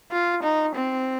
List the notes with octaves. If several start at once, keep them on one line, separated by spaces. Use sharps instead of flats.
F4
D#4
C4